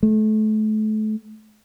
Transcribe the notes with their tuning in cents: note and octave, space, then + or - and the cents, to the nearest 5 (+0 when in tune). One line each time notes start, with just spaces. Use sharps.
A3 -30